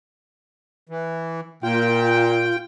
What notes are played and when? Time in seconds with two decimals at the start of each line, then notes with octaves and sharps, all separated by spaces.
0.89 E3
1.63 A#2 F4 G5